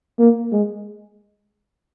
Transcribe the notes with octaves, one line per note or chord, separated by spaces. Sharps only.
A#3
G#3